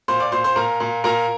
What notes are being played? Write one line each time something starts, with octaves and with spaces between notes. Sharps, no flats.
A#2 C5 C6
D5 D6
A#2 C5 C6
C5 C6
A#2 A#4 A#5
A#2
A#2 A#4 A#5